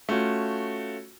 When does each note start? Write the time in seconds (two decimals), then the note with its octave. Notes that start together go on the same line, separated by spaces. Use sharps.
0.09 A3 C#4 F4 F#4